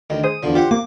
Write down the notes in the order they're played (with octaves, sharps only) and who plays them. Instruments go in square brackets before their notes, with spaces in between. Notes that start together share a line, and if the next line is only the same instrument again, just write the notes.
[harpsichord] D2 D#3
[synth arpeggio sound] G#4 C5 [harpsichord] D#6
[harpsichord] E2 D3 F3
[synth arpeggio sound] F4 [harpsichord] G4 C5 F#5
[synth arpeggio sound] A#3 [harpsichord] D6